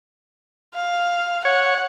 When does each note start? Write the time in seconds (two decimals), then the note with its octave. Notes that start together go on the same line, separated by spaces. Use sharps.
0.75 F5
1.45 C#5 F#5